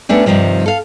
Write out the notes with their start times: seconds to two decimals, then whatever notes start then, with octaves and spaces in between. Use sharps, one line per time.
0.09 A3 B3 C#4 D4 G4
0.26 G2 C3 D#3 F3 G3
0.66 A4 F5